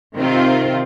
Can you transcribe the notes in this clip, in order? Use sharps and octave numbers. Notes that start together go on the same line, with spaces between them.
C3 D#3 C4 F4